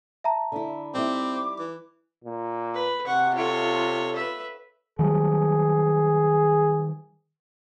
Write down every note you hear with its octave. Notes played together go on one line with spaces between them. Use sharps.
E5 A5 A#5
D3 E4
G3 C4 D#4 E4 D6
E3
A#2
B4
C3 F#5 C#6
F4 A4 C#5
B4 E5
D#3 F#3 G3 G#4